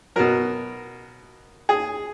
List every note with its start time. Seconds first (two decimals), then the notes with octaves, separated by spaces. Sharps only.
0.16 B2 F#3 A#4
1.69 G#4